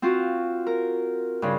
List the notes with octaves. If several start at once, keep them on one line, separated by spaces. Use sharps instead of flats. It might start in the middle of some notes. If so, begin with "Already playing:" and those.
C4 F4 F#4
A#4
G2 C#3 F4